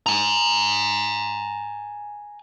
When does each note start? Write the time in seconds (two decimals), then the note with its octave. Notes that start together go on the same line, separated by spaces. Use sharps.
0.06 G#5 A#5